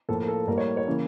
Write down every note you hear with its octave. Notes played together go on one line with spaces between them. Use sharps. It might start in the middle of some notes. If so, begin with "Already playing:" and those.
A2 F3 A#3 A4
A#4
A4
A2 G3 A#3 A#4
C#5
C#5
C#3 E3 A#3